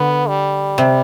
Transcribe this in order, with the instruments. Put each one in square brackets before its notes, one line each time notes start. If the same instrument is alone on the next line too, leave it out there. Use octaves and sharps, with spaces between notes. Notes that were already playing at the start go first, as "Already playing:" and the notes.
Already playing: [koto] D3 [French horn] B3
[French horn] G3
[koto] C3